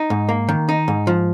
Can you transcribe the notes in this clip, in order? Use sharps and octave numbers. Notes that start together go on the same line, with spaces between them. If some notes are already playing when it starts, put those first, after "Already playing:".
Already playing: D#4
G#2
A#3
D#3
D#4
G#2
F3